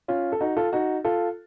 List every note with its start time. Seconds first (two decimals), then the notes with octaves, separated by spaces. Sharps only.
0.08 C#4 F4
0.32 A4
0.41 D#4 F#4
0.57 F4 A4
0.73 D#4 F#4
1.05 F4 A4